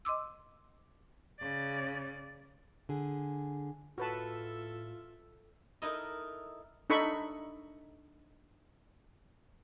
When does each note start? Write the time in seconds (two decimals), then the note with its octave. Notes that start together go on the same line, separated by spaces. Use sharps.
0.05 D#5 C6 D6 E6
1.39 C#3 D5
2.89 D3 G#4
3.98 A2 F4 F#4 A4 B4 E5 A5
5.82 D#4 E4 A4 A#4 D#5
6.90 D4 D#4 A4 B5 C#6